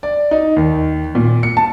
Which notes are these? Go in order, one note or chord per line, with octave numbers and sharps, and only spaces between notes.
D5
D#4
D#2
A#2
C#7
A5